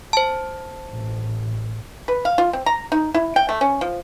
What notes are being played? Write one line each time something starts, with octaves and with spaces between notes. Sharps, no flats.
C5 A5
A1 A2
B4
F5
F4
C4
A#5
D#4
E4
G5
A3
C#4
F3